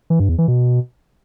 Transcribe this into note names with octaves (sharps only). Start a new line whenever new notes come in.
E3
G2
E2
E3
B2